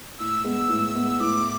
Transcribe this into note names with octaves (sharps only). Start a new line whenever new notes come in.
A2 E6
G#3 B3
A2
G#3 B3
A2 D6